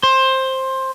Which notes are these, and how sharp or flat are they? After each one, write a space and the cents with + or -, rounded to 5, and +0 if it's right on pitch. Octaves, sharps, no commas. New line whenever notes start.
C5 +15